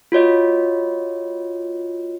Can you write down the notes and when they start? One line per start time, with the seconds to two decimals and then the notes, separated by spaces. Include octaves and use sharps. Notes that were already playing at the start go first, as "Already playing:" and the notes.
0.12 F4 F#4 C#5 D#5